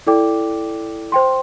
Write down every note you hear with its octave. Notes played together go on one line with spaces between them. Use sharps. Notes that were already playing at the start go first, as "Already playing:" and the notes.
E4 A4 D5 G5 D6
C5 G5 C6